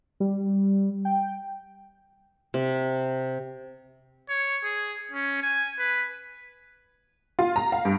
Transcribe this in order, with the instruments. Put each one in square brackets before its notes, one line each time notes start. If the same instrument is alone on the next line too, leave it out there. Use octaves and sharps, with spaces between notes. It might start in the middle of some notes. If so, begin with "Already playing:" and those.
[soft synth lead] G3
G5
[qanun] C3
[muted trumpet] C#5
G#4
C#4
G#5
B4
[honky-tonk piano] F4
A#5
F5
G2